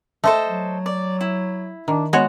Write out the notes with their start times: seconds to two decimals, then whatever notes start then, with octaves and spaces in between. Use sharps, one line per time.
0.24 A3 A4 C5 D#5
0.48 F#3
0.86 D5
1.21 E4
1.88 D#3 D4
2.13 G#3 B3 F#4 C#5